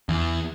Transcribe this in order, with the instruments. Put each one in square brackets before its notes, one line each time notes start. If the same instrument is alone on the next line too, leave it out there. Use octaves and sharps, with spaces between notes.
[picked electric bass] E2